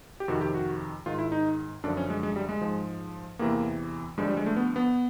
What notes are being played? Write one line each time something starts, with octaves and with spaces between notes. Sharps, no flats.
G4
F2 C3 D#3 F#4
G4
F#4
G#2 D#3 F4
E4
D#4
F#2 D3 F3 D4
C#4
G#3
G#3
G3
G#3
G#2 F3
E2 C3 E3 A#3
G2 D3 F3 G#3
G3
G#3
A3
B3
B3